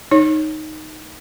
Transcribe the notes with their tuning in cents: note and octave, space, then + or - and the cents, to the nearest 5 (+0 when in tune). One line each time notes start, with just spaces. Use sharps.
D#4 +0 C#5 +0